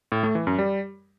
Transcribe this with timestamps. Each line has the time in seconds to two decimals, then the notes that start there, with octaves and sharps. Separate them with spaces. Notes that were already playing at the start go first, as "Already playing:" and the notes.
0.12 A2
0.23 A3
0.35 E3
0.47 F#2
0.58 G3